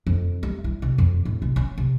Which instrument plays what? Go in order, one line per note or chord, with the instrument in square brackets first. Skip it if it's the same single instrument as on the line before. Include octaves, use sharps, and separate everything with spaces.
[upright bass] F2
G3
E4
C3
F2
A2
C3
C#4
C3